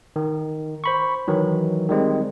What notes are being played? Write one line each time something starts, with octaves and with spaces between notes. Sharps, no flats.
D#3
C5 B5 C#6
D#3 E3 F#3
D#3 G3 G#3 C4